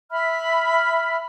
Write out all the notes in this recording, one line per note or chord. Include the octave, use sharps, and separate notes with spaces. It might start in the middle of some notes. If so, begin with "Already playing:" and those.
E5 B5 F6